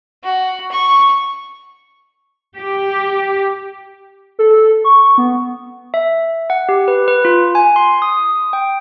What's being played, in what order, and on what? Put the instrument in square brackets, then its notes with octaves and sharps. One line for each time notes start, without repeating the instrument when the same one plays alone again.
[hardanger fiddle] F#4
C#6
[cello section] G4
[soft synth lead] A4
C#6
B3
[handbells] E5
F#5
G4
B4
B4
F4
G#5
C6
D#6
G5